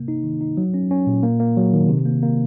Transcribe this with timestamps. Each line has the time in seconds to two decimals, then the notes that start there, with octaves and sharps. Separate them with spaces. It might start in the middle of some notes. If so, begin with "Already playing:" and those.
Already playing: C3 A#3
0.08 D#4
0.24 D#3
0.41 D#4
0.57 F#3
0.74 C#4
0.91 C#4
1.07 A#2
1.23 A#3
1.40 A#3
1.57 F#3
1.74 D#3
1.89 C3
2.05 A#3
2.23 A#3